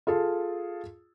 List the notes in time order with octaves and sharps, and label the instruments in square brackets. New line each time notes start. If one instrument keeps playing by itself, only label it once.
[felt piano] F4 G#4 A4